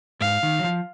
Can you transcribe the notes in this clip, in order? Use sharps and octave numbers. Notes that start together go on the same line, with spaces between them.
G#2 F5
D#3
F#3
F3